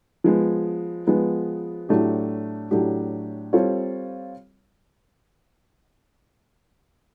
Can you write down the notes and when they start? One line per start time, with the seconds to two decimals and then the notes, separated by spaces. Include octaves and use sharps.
0.24 F3 G#3 B3
1.07 F3 G#3 B3
1.89 A2 F#3 A3 D4 G4
2.71 A2 F#3 A3 D4 G4
3.53 G3 C4 F4 A4 C#5